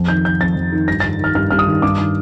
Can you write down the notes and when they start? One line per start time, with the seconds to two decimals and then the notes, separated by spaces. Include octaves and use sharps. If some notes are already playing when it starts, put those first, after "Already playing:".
Already playing: F2
0.08 D#3 G6
0.25 D#3 G6
0.41 F2 A6
0.56 F2
0.72 D#3
0.88 G2 A#6
1.00 A6
1.04 D#3
1.19 D#3 F6
1.35 G2 F6
1.51 G2 F6
1.59 D#6
1.67 D#3
1.82 G2 D6
1.98 D#3